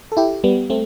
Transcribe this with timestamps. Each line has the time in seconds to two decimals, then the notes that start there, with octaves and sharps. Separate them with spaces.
0.12 A4
0.17 E4 G4
0.44 G3 B3
0.70 A3 C4